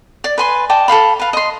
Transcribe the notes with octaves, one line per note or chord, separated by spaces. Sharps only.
D5
B4 G#5 C6
D5 D#5 G5 A5
A4 C5 F5 B5
B4 F5
D#5 C6